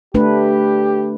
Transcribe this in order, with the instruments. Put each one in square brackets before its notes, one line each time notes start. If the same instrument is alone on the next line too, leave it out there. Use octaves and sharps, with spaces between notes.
[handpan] A3 D4 B4 [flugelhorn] G4